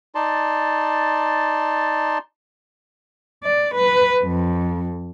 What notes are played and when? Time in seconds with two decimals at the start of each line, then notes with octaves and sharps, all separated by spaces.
0.15 D#4 D5 A5 C6
3.43 D5
3.74 B4
4.23 F2